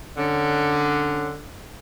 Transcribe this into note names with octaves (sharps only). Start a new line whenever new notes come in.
D3 C#4